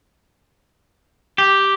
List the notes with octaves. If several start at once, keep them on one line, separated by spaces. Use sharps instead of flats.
G4